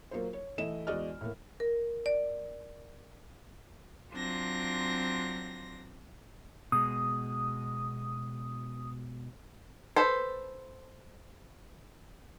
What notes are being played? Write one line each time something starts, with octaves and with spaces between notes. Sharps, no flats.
F#3 A#3 F4 A#4 C5
C#5
E3 A3 E4 D#5 E7
E2 G#3 F#4 D5 D#5 F6
A2 A#3
A#4
D5
F#3 C4 D4 F4 A#6
B2 G#3 D#6
A4 B4 C5